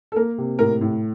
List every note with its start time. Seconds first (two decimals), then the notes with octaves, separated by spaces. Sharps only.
0.12 A4
0.16 A#3 A#4
0.38 C3
0.59 A2 A#4
0.81 A2